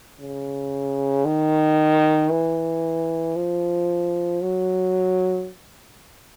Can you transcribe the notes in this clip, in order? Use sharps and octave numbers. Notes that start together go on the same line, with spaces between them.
C#3
D#3
E3
F3
F#3